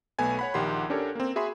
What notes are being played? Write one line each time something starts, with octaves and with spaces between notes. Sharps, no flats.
B1 A3 B3 G#5 G#6
C#5 F#5 B5
A#1 D#3 G4 F#5 C6
C#4 D4 G4 A4 A#4 C#5
A#3 C4
F#4 G#4 E5 B5 C6